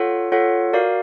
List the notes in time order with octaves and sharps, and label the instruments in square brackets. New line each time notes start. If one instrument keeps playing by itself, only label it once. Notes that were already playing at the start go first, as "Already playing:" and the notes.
Already playing: [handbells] F4 A4 C#5 F#5
F4 A4 C#5 F#5
F#4 A#4 D5 F5